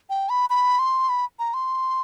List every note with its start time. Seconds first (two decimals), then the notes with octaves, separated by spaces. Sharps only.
0.10 G5
0.29 B5
0.50 B5
0.79 C6
1.09 B5
1.39 A#5
1.54 C6